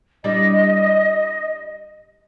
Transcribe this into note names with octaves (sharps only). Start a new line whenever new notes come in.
G3 D4 E4 D#5